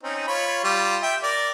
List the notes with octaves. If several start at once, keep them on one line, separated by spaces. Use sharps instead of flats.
C4 C#4 D#4
F4 C#5 B5
G3 F4
E5 G5
A#4 D5